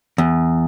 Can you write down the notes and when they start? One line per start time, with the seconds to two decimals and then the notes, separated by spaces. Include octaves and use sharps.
0.18 E2